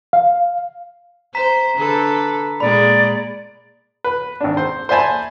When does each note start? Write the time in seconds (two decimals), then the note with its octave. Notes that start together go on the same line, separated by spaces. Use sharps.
0.13 F5
1.35 C5 A#5 B6
1.76 D3 A4 B4
2.60 A#2 G#3 D5 B5
4.04 B4
4.41 G#1 D4
4.57 C5
4.89 C5 D5 E5 G#5 A5 B5